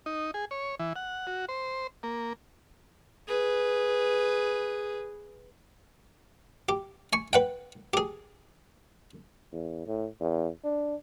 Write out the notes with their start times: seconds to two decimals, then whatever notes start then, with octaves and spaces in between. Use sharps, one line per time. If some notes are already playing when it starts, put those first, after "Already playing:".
0.06 D#4
0.34 G#4
0.51 C#5
0.79 E3
0.96 F#5
1.27 F#4
1.49 C5
2.03 A#3
3.27 G#4 B4
6.69 G4
7.13 G#5 C#6
7.33 B4 F#5 G5
7.94 G4 G#4
9.52 E2
9.87 A2
10.20 E2
10.64 D4